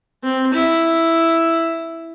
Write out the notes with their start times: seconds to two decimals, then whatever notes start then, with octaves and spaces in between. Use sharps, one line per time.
0.24 C4
0.54 E4